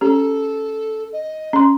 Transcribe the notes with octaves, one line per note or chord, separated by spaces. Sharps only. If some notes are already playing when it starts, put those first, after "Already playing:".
C#4 G4 A4
D#5
C#4 C6